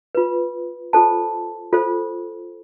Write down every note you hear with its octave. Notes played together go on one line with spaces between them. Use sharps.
F4 B4
F4 A4 C5 A5
F4 A4 C5